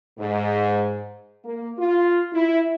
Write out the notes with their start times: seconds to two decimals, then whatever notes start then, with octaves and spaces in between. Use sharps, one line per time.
0.19 G#2
1.45 A#3
1.78 F4
2.33 E4